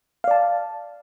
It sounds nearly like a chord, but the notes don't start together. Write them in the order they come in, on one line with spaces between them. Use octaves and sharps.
F5 D5 A5